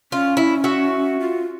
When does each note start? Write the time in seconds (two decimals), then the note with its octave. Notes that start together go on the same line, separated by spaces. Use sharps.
0.12 C#4 F4
0.37 E4
0.64 F#4 E5
1.20 F4